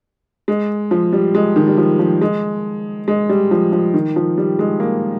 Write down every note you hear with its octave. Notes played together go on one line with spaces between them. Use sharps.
G#3
F3
G3
G#3
D#3
G3
F3
F3
G#3
G#3
G3
F3
F3
D#3
F3
G3
G#3
A#3